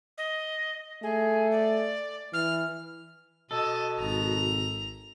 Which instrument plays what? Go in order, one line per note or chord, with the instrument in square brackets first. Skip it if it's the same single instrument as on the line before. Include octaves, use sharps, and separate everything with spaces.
[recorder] D#5
[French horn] A3 [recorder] G#4
[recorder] D5
[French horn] E3 [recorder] F6
[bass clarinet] B2 [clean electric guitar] A4 [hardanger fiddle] D#5 A5
[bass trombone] G#1 [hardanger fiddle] A#5